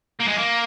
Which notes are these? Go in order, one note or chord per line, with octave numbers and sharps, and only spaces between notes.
A#3
G#3
A#3